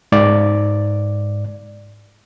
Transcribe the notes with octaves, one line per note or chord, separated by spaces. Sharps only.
G#2 D5